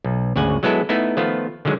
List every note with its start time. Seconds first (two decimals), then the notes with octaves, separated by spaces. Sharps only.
0.05 B1
0.36 G#1 D2 C#3 F#5 G#5
0.63 F#3 G#3 B3 E4 A4
0.89 A3 B3 D#4 E4
1.17 D#3 F3 A3 B3 F4
1.65 D3 D#3 F#3 G#3